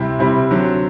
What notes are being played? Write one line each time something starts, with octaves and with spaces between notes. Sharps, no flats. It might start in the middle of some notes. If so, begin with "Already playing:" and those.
Already playing: C3 G3 C4 E4
C3 G3 C4 E4
D3 F#3 C4